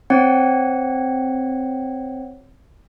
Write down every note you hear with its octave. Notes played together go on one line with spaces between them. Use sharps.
C4 C#5 F#5